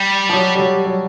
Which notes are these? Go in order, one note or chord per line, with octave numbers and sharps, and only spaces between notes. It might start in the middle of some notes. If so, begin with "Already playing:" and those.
Already playing: G3
F3
F#3
G3
F#3
F#3